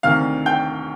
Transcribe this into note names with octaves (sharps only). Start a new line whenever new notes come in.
D2 C3 D#3 F5 F6
G5 G6